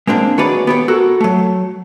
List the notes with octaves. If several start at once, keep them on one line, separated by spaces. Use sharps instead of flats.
G#3 A#3 C4 D4
D#3 F#4 G#4 B4 C#5 D5
B3 G4 C#5
F#4 A4 A#4
F#3 A3